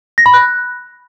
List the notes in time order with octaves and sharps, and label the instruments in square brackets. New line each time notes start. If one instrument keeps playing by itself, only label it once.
[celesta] A#6
B5
F#6